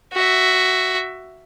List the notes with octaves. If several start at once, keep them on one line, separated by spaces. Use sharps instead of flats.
F#4 E5